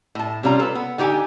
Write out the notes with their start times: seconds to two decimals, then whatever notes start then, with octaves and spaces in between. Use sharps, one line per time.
0.15 A2 A5
0.43 C3 G3 C#4 F4 A#5
0.59 A4 B4
0.75 B3
0.98 D3 D#4 G4 G5 G#5